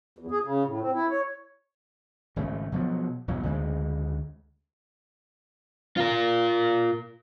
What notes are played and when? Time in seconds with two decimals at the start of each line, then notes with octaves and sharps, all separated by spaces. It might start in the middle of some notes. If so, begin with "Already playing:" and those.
0.19 E2
0.31 G#4
0.44 C#3
0.65 A2
0.81 C4
0.94 E4
1.09 C#5
2.36 G#1 C#3 A3
2.72 B2 F3 F#3
3.28 B1 E2 A2 F#3
3.43 D2 C#3 F3 G#3
5.97 F4 A#4